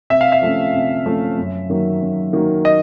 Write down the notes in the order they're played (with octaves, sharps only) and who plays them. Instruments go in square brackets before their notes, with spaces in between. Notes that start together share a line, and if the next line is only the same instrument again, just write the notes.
[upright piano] C3 [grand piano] E5
[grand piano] F5
E5
[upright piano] F3 A3 C#4
C3
F3 A3 C#4
F#2
D#3 F#3 A#3
F#2
D#3 F#3 A#3
[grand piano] D#5